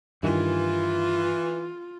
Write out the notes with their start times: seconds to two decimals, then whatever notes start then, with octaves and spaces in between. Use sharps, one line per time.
0.23 G2 D#3 E3 F4